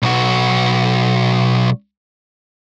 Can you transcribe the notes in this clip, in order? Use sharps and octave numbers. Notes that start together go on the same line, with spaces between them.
B1 F#4